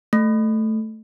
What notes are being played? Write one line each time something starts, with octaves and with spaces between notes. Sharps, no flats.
A3